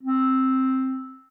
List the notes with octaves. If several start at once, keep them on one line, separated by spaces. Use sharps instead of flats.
C4